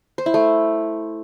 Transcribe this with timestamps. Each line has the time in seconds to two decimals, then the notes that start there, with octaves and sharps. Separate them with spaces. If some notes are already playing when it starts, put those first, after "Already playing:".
0.18 C5
0.26 E4
0.34 A3